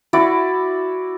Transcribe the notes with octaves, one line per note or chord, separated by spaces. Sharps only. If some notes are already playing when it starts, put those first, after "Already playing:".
E4 F#4 D5